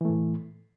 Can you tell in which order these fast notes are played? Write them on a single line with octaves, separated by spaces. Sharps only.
E3 A3 A2